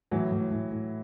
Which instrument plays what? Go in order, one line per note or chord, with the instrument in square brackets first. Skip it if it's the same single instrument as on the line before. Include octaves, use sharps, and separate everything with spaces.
[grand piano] A2 [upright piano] E3 F#3
[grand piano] A2
A2
A2